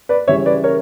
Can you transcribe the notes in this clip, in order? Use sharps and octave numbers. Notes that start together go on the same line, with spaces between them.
B4 D5
C#3 E3 G3 C#5 E5
B4 D5
A#4 C#5